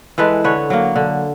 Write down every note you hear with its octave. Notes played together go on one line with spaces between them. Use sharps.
E3 G#3 A4 B4
D3 B4 C#5
F#3 A#3
D3